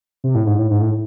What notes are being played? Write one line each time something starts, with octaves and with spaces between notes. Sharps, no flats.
C3
A2
G#2
A2
G#2
A2